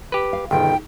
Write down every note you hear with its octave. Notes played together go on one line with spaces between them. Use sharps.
G4 B4
F5
G1 B2 D#3 G#4 G5